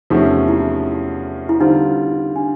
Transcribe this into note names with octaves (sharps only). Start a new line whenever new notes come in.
E2 C3 F3 A3 C#4 D#4
E4
E4
D3 G3 C4 D#4 F4
D4